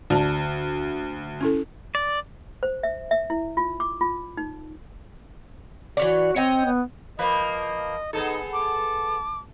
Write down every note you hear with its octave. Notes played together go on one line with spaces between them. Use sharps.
D2 D5 A5
C#4 E4 A4
D5
C5
E5
E5
E4
F4
D6
F4
D#4
E3 F#4 C#5 D5
C4 C#5 D#5 G5
B3
F3 A#3 B4 D#5
B3 D#4 G#4 A4
A5 D6